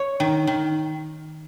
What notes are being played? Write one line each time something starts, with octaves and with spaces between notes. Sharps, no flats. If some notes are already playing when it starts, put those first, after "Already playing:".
Already playing: C#5
D#3
D#3